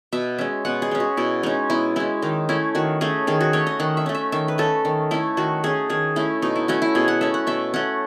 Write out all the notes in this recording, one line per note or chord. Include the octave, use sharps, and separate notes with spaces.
B2 E5
G#3 C#4 E5
B2 F#5
G#4
G#3 C#4
F#4
B2 E4
G#3 C#4 D#4
B2 E4
G#3 C#4 E4
D#3 D#4
A3 C#4 E4
D#3 F#4
A3 C#4 G#4
D#3 G#4
F#4
A3 C#4 C#5
D#5
D#3 F#5
E5
A3 C#4
E5
D#3 E5
B4
A3 C#4 A4
D#3
A3 C#4 E4
D#3 F#4
A3 C#4 G#4
D#3 G#4
A3 C#4 E4
B2 D#4
E4
A3 C#4 F#4
E4
B2 G#4
F#5
A3 C#4 E5
F#5
B2 E5
A3 C#4 F#5